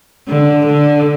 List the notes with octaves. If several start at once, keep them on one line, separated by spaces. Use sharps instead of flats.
D3
D3